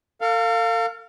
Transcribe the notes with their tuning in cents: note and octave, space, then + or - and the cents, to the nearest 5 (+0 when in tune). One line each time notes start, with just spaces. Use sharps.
A4 +45 F5 +0